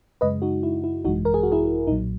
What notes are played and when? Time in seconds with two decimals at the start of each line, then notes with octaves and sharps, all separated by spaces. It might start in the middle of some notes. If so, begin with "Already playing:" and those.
0.21 F#2 C#3 G#3 B4 D#5
0.42 D#4 F#4
0.63 E4
0.84 E4
1.05 G#1 F#2 E3 G#3 D#4 F#4
1.25 A#4
1.34 G#4
1.43 F#4
1.52 E4 G#4
1.87 B1 A#2 F#3 D#4